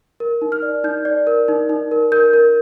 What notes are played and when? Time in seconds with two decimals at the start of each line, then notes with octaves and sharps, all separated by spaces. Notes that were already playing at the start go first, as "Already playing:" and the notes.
0.20 A#4
0.42 D#4
0.52 F6
0.62 D5
0.84 D#4 G6
1.05 D5
1.27 A#4
1.48 D#4
1.69 D#4
1.91 A#4
2.12 A#4 G6
2.33 A#4